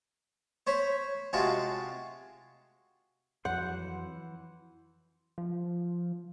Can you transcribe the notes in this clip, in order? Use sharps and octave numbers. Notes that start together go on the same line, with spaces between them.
C5 C#5 B5
C3 G#3 F4 F#4 A5
F2 E3 F#3 F#5 C6 G6
F3